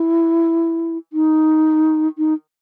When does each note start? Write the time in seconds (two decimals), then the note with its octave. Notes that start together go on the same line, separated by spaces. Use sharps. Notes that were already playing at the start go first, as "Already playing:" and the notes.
Already playing: E4
1.13 D#4
2.18 D#4